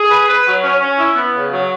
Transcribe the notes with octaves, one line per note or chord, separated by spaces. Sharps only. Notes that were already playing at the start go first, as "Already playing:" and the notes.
Already playing: G#4
B4
B4
F#3
C#4
C#4
E4
B3
C#3
F#3